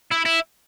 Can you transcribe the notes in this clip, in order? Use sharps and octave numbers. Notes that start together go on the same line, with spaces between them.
E4
E4